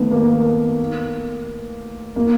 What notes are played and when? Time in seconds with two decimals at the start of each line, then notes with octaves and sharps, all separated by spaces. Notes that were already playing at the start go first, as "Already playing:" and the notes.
Already playing: D#3 A3 B3
0.11 A#3
2.16 A#3